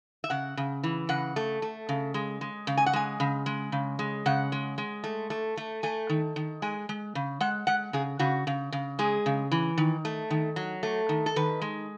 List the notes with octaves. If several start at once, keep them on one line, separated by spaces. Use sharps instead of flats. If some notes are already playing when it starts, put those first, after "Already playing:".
E5
C#3 F#5
C#3
E3
C#3 F#5
A3
A3
C#3
G#3
G#3
C#3
G#5
F#5
G#3 G#5
C#3
G#3
C#3
G#3
C#3 F#5
G#3
G#3
A3
A3
A3
A3 G#5
D#3
D#3
G#3 G#5
G#3
C#3
G#3 F#5
G#3 F#5
C#3 G#4
C#3 F#4
C#3
C#3
G#3 G#4
C#3
E3
D#3
A3
D#3
F#3
A3
D#3
A4
D#3 B4
G#3